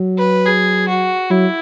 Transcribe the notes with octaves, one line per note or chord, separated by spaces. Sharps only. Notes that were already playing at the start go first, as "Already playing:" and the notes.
Already playing: F#3
B4
G#4
F#4
F#3 E4